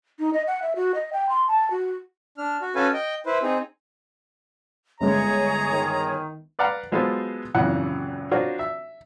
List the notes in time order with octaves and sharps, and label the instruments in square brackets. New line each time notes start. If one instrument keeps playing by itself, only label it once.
[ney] D#4
D#5
F#5
E5
F#4
D#5
G5
C6
A5
F#4
[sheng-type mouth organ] D4 F6
F#4
C#4 F#4 A4 B4 F5 G#5
D#5 G5
E4 B4 C5
C4 D#4 G#4
[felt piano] G1 G#3 [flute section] G#4 C#5 [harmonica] A#5
[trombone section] D#3
[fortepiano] B4 D5 F5 F#5 A#5 B5
F#3 G#3 B3 F4 A4 C5
G#1 F#2 A#2 C#3 E3 F#5
D4 F4 F#4 A#4 C5 C#5
E5